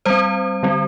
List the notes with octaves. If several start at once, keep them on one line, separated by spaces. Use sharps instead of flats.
G3 C4 C5
D3 G3 C4